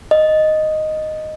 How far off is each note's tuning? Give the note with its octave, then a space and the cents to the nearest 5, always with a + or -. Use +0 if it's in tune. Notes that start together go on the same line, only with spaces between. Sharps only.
D#5 -5